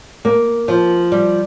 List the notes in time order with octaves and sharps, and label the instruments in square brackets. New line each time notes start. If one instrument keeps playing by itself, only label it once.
[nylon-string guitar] A#3
F3
G3